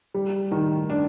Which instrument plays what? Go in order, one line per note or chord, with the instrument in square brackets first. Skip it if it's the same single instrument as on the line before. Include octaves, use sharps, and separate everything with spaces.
[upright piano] G3
D#3
D4